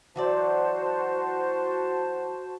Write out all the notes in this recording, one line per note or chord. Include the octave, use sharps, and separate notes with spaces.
E3 F#3 F#4 C5 D5 A5